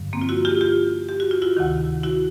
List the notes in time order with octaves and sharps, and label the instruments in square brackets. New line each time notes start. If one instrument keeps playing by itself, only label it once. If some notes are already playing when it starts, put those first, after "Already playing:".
Already playing: [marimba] G2 D3 F3
A#3 C4
F4
E4 F#4
F4 G4
F4 G4
G4
F#4
F4
E4 F#4
D2 C3 D#3
E4 F#4